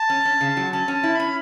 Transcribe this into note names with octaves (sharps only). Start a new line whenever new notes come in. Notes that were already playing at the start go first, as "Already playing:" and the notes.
Already playing: A5
C#4
C#4
C#3
F#3
C#4 A5
C#4
A5
E4
B5
C#4